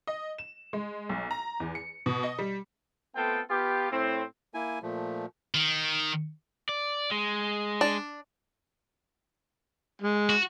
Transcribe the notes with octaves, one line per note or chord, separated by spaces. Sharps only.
D#5
E7
G#3
B1
A#5
E2
C#7
B2
D#5
G3
A3 B3 C4 F4 A4 G5
B3 F4 G4
A2 C4
A#3 E4 G#5
A#2 F3 A3
D#3
D5
G#3
D4
G#3
F#4